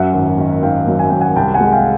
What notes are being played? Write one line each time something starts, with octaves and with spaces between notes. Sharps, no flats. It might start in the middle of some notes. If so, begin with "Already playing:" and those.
Already playing: F#2 E5 F#5
G#1
D#3
G#1 F5 G5
F#2
G#5
F#2 G5
F#5 G#5
C2 G5 A5
F#5 G#5
G#3
F5 G5